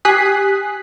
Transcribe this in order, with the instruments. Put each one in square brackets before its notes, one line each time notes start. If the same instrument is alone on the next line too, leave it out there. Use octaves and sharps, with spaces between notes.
[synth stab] G4 G#5 D#6 F#6 B6 C7